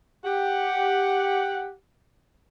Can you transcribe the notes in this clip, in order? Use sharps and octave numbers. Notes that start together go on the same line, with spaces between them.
G4 F#5